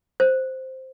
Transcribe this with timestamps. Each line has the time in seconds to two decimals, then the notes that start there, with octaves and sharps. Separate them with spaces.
0.20 C5